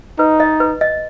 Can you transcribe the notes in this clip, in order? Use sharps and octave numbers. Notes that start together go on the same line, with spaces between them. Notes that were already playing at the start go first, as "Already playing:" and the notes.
D#4 B4
D#5
B4
D#5